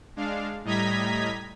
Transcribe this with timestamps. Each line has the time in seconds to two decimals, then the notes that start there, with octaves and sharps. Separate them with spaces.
0.16 G#3 D4 F5
0.64 A2 G3 D#5 A#5 G#6 B6